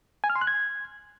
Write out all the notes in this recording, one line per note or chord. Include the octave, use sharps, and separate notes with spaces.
G#5
F6
C6
F#6
G#6